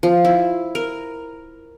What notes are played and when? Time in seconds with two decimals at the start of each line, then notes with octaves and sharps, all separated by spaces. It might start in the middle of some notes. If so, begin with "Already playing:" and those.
0.03 F3
0.25 E4
0.75 A#4